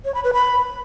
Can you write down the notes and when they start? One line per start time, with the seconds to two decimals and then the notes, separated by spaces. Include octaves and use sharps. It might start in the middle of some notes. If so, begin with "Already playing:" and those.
0.05 C#5
0.14 B5
0.24 B4
0.33 B5